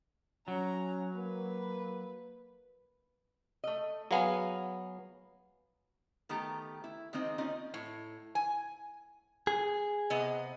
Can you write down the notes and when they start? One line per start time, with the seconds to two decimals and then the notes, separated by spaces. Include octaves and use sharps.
0.48 F#3 C#4 A#5
1.16 A#3 B4
3.64 A3 D#5
4.11 F#3 B3 G#4 F5 G#5
6.29 D#3 A3 B3 G4 A#5
6.84 E4
7.13 D#3 G#3 A#3 C4 D#4
7.38 C4 C#4 D#4 F4 D5 D#5
7.74 A2
8.35 G#5
9.47 G#4
10.10 C3 B3 D#5